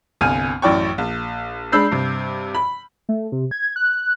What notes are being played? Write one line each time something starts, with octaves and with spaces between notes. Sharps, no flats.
G1 C2 G#5 F6 D#7
A1 F#2 E4 D5 G5 C#6
A#1
G#3 D4 B5 E6 G6 C7
G2 C3
B5
A3
C3
G#6
F#6